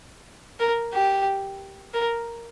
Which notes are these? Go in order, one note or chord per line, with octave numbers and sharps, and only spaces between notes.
A#4
G4
A#4